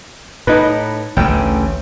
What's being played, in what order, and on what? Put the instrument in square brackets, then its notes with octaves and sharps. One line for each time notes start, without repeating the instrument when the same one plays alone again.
[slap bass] A2 [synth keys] D#4 B4
[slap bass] A1 D2 C#3 [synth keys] G5